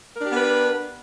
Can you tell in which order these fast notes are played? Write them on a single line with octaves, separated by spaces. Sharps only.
A#4 D4 G4 B3 B4